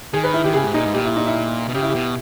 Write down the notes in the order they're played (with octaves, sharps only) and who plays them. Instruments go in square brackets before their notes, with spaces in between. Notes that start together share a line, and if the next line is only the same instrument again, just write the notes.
[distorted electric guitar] D#3 [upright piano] G#4
[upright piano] B4
E4
[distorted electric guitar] D#3 [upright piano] G4
[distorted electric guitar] C#3 [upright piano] G#4
[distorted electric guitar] G#2
[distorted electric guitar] A#2 [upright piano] D#4
[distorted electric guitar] G#2
[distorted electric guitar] A#2 [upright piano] G4
[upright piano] E4
D#4
E4
[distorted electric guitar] B2
[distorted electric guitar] C#3 [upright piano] G4
[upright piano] E4
G4
[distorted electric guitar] B2